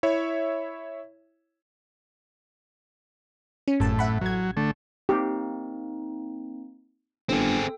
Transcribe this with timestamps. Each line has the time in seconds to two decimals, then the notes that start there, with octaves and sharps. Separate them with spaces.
0.03 E4 C#5 E5
3.68 C#4
3.80 G#1 F#2 A2 A5
3.99 E5 F#5 B5
4.21 A1 F#3 G#6
4.57 D3 A3
5.09 A#3 C4 D#4 G4
7.29 G1 C4 G#4 A4 G5